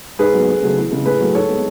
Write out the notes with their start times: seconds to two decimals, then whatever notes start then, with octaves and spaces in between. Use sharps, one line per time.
0.19 G#2 G#4 B4
0.34 F#3 B3
0.48 D2
0.62 C#3 F#3 A3
0.77 E2
0.91 C#3 G#3
1.06 A2 G#4 B4
1.21 F#3 A3
1.35 G#2 A4 C#5
1.49 G#3 B3